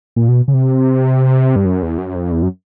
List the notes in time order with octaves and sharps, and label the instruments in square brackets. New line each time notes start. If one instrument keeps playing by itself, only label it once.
[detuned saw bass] A#2
B2
C#3
C3
G2
F#2
E2
F#2
F2
E2
F#2